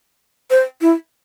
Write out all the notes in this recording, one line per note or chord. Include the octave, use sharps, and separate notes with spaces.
C5
E4